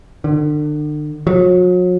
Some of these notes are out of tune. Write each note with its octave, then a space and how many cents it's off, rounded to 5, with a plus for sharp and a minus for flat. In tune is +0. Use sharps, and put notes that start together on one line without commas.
D3 +40
F#3 -40